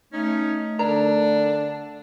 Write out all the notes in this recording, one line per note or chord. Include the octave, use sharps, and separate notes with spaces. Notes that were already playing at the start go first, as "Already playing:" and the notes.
A3 C#4 D#4
D3 D4 A#4